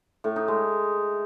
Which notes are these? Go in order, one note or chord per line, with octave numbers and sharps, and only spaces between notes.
A2
D#4
G#3